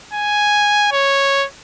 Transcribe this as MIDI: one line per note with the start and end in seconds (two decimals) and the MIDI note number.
0.13 0.89 80
0.92 1.46 73